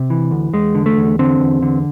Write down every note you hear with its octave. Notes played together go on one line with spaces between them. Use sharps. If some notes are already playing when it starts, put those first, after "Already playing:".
Already playing: C3
E3
D2
E2 G#3
D3
A3
E2
D3 C4
E2
D3